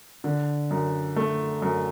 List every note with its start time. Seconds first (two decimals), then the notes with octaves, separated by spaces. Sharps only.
0.24 D3
0.71 F#2
1.16 A3
1.62 F#2